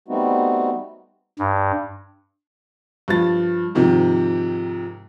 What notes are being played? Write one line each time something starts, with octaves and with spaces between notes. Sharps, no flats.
G3 A3 B3 C4 D#4 F#4
G2
G2 F3 A6
G#2 C3 D#3 F3